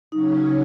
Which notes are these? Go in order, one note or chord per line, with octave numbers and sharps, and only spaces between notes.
C#3 F#3 C#4 D#4